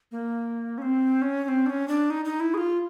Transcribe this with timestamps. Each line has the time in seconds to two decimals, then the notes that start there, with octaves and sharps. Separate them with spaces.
0.12 A#3
0.78 C#4
0.82 C4
1.22 C#4
1.44 C#4
1.48 C4
1.66 D4
1.70 C#4
1.88 D4
2.10 D#4
2.25 D#4
2.40 E4
2.54 G#4
2.58 F4